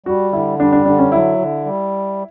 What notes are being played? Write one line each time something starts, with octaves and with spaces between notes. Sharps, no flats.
G3 F#4
D3 E4
G3 D4
D4
D3 D4
C#4
F#3 E4
D3
G3